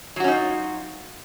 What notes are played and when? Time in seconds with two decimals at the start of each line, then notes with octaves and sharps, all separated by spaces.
0.16 F#3
0.20 F#4
0.24 C#4
0.28 D#4
0.32 F4